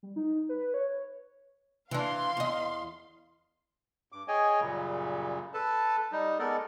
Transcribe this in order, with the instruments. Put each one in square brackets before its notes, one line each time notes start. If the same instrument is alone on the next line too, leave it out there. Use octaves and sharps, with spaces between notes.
[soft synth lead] G3
D#4
B4
C#5
[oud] E3 D4 [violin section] F5 C6
[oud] E2 D#5
[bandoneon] G2 D6
G#4 C#5 D#5 G5 G#5
F#2 A#2 C#3 G3
A4 B4 A5
G3 D#4
G#3 B3 A4 A#4 D5